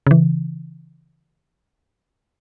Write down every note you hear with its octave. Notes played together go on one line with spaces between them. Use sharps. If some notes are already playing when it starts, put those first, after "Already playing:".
C#3 E3